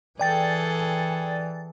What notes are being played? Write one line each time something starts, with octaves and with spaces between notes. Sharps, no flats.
E3 G#4 A4 D5 G5 A6